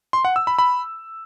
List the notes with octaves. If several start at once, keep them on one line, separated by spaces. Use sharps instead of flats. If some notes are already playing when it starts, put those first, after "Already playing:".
C6
F#5
E6
B5
B5